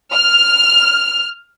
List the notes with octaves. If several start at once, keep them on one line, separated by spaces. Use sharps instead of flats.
F6